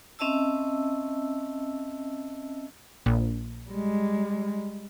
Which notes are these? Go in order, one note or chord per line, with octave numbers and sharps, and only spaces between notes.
C4 C#4 D#5 E5 A5 E6
A#1 A#2
G3 G#3